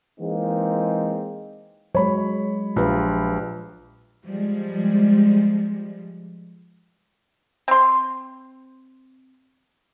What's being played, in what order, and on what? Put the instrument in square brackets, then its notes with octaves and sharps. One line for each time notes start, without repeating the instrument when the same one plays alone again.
[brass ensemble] E3 G#3 A#3 C4 D#4
[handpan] F#3 G#3 [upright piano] C#5 B5
[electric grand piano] A#1 [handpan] F4 G4 B4
[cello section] F3 G3 G#3
[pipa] C4 C6